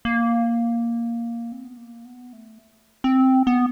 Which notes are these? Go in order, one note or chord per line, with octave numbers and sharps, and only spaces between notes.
A#3
C4
B3
A#3
B3
A3
C4
B3